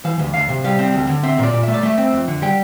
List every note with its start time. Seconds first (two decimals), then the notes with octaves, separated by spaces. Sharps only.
0.05 E3 F5
0.19 D2
0.34 D2 F5
0.49 C3
0.64 G3 F5
0.79 C4
0.94 D2
1.09 D3
1.23 C4 E5
1.39 A#2 D5
1.53 A#2
1.63 A3 E5
1.74 D5
1.83 A3 E5
1.98 C4
2.13 F2
2.28 D3
2.42 G3 G5